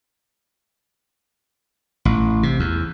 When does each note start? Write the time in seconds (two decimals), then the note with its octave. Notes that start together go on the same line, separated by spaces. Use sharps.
2.05 A1
2.43 C3
2.60 E2